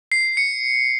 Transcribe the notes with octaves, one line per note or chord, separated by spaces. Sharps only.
C7
C#7